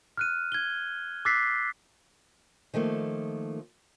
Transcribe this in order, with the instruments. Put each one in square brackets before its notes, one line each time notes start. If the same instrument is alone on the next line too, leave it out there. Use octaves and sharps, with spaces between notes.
[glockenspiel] F6 F#6 D#7
G#6 G7
D6 E6 F#6 A6 B6 C7
[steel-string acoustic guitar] D#3 F3 A3 A#3